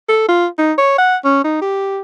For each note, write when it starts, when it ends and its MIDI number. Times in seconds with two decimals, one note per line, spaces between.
0.09 0.28 69
0.28 0.46 65
0.58 0.73 63
0.78 0.96 73
0.98 1.16 78
1.24 1.44 61
1.44 1.60 63
1.61 2.02 67